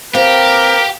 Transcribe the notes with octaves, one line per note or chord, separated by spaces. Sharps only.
C4 G4 A#4 B4 F5